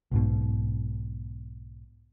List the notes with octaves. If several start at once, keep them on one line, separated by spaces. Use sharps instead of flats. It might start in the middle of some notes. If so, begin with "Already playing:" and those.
B1 G#2 B2